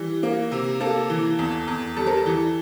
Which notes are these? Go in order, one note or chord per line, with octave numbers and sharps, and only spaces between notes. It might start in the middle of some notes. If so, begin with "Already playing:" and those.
Already playing: E3 G3
A#3
C3
A#3 A4
E3
E2
E2
G3 A4
A#4
A4
E3